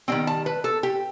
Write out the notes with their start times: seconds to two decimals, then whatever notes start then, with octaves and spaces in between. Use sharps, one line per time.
0.08 D#3 G3 C4 G5
0.27 A5
0.46 B4
0.64 A4
0.83 G4